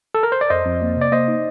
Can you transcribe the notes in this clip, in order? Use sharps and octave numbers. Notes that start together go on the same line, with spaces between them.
A4
A#4
C5
D5
F2 C5 D#5
F2
A#3
C3
D5
A#3 C5 D#5
D#4